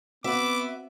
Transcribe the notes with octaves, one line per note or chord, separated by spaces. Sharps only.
B3 C4 F#4 E5 D6